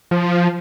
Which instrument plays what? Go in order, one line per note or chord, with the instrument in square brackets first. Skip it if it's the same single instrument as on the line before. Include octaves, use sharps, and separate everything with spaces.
[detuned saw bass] F3